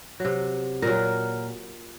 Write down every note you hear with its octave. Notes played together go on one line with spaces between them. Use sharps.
C3 F#3
A#2 F#3 A#4